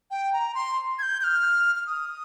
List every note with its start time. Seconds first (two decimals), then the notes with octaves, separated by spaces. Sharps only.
0.11 G5
0.33 A#5
0.55 C6
0.99 G#6
1.02 G6
1.21 G6
1.24 F6
1.76 F6
1.86 D#6